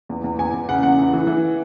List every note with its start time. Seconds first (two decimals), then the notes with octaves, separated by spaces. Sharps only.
0.09 E2
0.24 E2
0.38 E2 G#5
0.53 E2
0.68 C#3 F#5
0.83 E2 F#5
0.98 E3
1.13 E3
1.27 E3